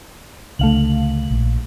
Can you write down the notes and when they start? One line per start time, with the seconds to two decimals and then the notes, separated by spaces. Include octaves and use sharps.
0.59 C#2 D3 A3 F5 F#7
1.30 A#1